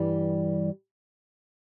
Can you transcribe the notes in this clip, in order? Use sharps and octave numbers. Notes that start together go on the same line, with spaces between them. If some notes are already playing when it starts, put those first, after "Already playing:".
Already playing: G2 E3 G3